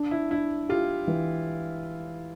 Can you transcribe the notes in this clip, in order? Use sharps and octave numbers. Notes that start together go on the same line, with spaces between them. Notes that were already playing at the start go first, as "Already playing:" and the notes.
Already playing: D4
E4
D4 E4
F4 G4
E3